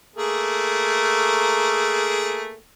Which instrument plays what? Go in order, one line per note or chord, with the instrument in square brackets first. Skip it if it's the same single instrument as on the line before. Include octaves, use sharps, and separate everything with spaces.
[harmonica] A3 A#3 G#4